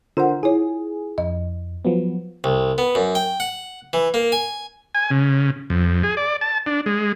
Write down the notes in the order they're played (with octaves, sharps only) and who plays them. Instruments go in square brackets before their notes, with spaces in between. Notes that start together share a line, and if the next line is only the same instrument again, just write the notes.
[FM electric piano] D3 A#4 C5 [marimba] F4 F#5
[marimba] E4 C#5 [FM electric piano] G#4
[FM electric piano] F2 [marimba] D#5
[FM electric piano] F3 F#3 B3
[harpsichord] C2
B3
F#2
G5
F#5
E3
A#3
G#5
[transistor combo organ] G#5
C#3
F2
G#4
D5
A5
D4
G#3